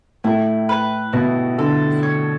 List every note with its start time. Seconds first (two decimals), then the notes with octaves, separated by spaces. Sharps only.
0.24 A2 A3 E4
0.69 B4
1.13 B2 B3 E4
1.58 D3 A4
2.03 C#5